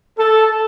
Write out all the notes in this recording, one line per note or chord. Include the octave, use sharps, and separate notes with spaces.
A4